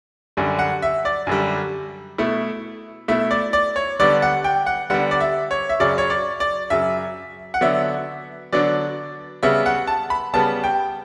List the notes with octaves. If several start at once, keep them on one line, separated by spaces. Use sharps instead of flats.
F#2 D3 G3
F#5
E5
D5
F#2 D3 G3
B2 A3 E4
B2 A3 E4 E5
D5
D5
C#5
D3 G3 B3 D4 D5
F#5
G5
F#5
D3 G3 B3 D4 F#5
D5
E5
C#5
E5
F#2 C#3 F#3 D5
C#5
D5
D5
F#2 C#3 F#3 E5
F#5
D3 F#3 B3 D4 E5
D3 F#3 B3 D4 D5
C#3 G3 B3 E5
F#5
A5
B5
C#3 G3 B3 A5
G5